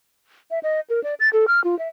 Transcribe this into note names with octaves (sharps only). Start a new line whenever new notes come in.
E5
D#5
A#4
D5
A6
A4
F6
F4
E5